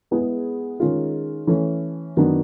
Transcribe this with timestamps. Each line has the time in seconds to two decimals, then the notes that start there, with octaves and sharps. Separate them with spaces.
0.11 G#3 B3 E4 G#4 B4
0.80 D#3 G#3 C#4 F4 G#4
1.47 E3 A3 C#4
2.17 F#2 D#3 F#3 B3 D4